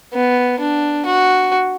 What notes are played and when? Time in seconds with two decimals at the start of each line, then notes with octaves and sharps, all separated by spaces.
0.14 B3
0.60 D4
1.06 F#4